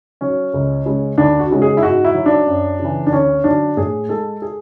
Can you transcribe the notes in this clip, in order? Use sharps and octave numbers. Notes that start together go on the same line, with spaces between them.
F#3 C#4
C#2
C#3 G#3
D2 D4
F#4
C#3 G#3
G#4
E4
G#2 F#4
E4
F#3
D4
F#2
C#3
E3
D4
D2 C#4
D3 F#3 D4
A2 G#4
G#3 A4
G#4